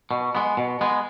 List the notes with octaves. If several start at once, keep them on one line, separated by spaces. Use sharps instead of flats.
B2
G#3 B3
B2
G#3 B3